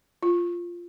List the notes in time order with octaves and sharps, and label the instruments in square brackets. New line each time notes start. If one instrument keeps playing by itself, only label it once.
[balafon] F4